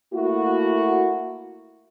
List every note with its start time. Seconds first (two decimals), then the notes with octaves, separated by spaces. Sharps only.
0.13 A3 A#3 E4 F#4